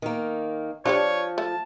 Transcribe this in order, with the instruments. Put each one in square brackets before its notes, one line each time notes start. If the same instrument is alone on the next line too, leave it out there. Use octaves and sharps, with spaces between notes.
[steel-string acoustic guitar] D#3 A#3
[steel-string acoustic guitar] F3 [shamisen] D4 G4 D5 [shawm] C#5
[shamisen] A3 [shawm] A5